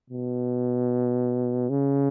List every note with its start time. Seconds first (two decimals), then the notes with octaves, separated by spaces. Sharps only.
0.10 B2
1.70 C#3